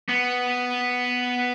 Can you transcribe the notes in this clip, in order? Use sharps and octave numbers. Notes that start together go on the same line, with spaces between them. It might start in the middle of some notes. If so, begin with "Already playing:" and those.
B3